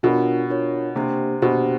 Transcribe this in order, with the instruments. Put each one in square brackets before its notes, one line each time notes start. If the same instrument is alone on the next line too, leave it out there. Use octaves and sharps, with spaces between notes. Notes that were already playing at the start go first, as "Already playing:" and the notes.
[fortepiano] B2 [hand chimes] D4 F4 A#4 C#5
[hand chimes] D4 F4 A#4 C#5
[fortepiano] C3 [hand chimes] A#3 D4 G4 C5
[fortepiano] B2 [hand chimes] A#3 D4 G4 C5